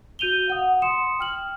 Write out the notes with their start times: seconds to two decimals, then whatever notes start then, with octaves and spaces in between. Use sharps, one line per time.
0.19 F#4 G6 D#7 F7 G7
0.48 F5 F#5 D#6
0.82 C6 D#6 C#7 E7
1.19 G5 F6 F#7